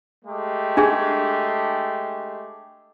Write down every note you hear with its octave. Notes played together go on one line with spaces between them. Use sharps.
G#3 A3 G4
D4 G#4